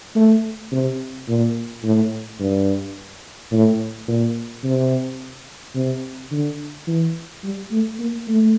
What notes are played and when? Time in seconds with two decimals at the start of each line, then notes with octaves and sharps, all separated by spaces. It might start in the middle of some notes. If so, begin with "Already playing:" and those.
0.16 A3
0.72 C3
1.28 A#2
1.84 A2
2.40 G2
3.52 A2
4.08 A#2
4.64 C3
5.75 C3
6.31 D3
6.87 E3
7.44 G3
7.71 A3
8.00 A#3
8.28 A3